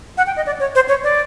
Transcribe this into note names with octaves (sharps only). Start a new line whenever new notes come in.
F#5
G5
D#5
D5
C#5
C5
C#5
D5